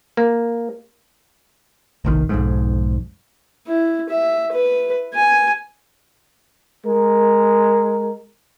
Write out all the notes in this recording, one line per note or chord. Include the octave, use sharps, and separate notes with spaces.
A#3
F1 A#1 D#3
B1 F2 G#2
E4
E5
B4
G#5
G#3 A#4